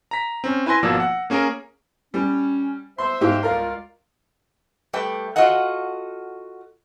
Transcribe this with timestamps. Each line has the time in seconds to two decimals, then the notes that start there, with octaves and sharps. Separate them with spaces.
0.11 A#5 B6
0.44 C4 C#4
0.66 E4 B4 G#5 C6 A#6
0.83 G#1 B2 F3 A#3 D5 E6
1.00 F#5
1.30 A#3 C#4 G#4 A#4
2.14 G3 C#4
2.98 C5 E5 C6
3.21 G#2 G4 F5
3.43 C#2 F4 A#4 D5 F5
4.93 G3 A3 G4 B4 G5
5.36 F4 F#4 A4 D#5 F#5